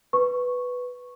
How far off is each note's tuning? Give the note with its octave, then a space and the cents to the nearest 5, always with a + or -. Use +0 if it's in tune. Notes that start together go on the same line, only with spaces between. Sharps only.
B4 +0 C#6 -5